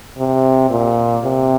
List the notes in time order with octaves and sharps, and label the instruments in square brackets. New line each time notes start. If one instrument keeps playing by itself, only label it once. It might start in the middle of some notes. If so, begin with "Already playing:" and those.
[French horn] C3
A#2
C3